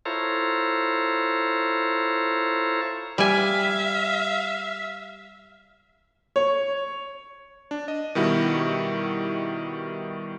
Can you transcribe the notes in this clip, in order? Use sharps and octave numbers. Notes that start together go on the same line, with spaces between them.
E4 F4 A4 C5 C#5 A#5
G3 E5 F5 G#5
C#5
D4
D#5
B2 D#3 G3 E4 F#4